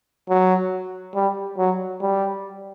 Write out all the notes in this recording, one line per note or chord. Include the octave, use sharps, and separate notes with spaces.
F#3
G3
F#3
G3